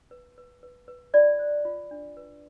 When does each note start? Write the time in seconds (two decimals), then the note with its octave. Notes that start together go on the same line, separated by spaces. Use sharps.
0.11 B4
0.38 B4
0.63 B4
0.88 B4
1.14 F4 D5
1.39 C5
1.65 F4
1.91 D4
2.17 B4